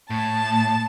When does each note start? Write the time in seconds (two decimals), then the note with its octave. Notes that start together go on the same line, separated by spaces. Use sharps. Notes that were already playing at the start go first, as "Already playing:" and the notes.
0.10 A2 A5